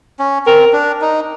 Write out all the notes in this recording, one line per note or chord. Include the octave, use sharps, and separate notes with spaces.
C#4
C4 A#4
D4
D#4